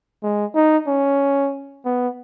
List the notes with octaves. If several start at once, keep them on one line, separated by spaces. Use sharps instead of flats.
G#3
D#4
C#4
B3